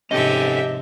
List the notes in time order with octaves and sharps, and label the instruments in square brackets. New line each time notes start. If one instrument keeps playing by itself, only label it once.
[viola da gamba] G#2 C3 F3 [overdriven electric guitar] C#4 A4 [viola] G4 E5 [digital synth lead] D#5